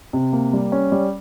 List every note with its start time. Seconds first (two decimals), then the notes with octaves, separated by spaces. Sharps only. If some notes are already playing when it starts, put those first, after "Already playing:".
0.13 C3
0.33 A#3
0.53 G3
0.72 C#4
0.92 G3